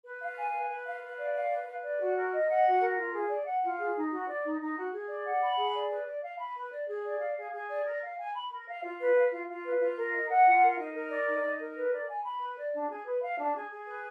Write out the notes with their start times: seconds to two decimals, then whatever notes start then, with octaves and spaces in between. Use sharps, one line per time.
0.03 B4
0.20 F5
0.37 G#5
0.52 B4
0.69 B4
0.85 F5
1.02 B4
1.18 D5
1.34 F5
1.50 B4
1.67 B4
1.83 D5
1.99 F#4
2.15 A#4
2.32 D#5
2.48 F#5
2.65 F#4
2.81 A#4
2.96 F4
3.13 G#4
3.29 D5
3.46 F#5
3.62 F4
3.78 G#4
3.94 D#4
4.10 F#4
4.27 D5
4.43 D#4
4.59 D#4
4.75 F#4
4.92 G#4
5.08 D5
5.25 F#5
5.40 B5
5.57 G#4
5.74 D5
5.90 B4
6.05 D5
6.22 F5
6.39 B5
6.55 B4
6.71 D5
6.88 G#4
7.03 D5
7.20 F5
7.36 G#4
7.52 G#4
7.69 D5
7.85 A#4
8.01 F5
8.17 G#5
8.33 B5
8.51 A#4
8.66 F5
8.82 F4
8.99 B4
9.15 F5
9.31 F4
9.48 F4
9.64 B4
9.80 F4
9.97 A#4
10.13 D#5
10.29 F#5
10.45 F4
10.62 A#4
10.77 D#4
10.94 A#4
11.10 D5
11.27 D#4
11.43 D#4
11.59 A#4
11.75 B4
11.92 D5
12.08 G#5
12.24 B5
12.40 B4
12.57 D5
12.73 D4
12.90 G#4
13.05 B4
13.22 F5
13.38 D4
13.54 G#4
13.71 G#4
13.87 B4